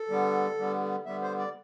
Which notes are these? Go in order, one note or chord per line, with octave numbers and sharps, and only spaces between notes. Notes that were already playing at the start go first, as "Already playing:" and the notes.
Already playing: A4
D3 G3 B3
D3 G3 B3
D3 G3 B3 E5
C5
D5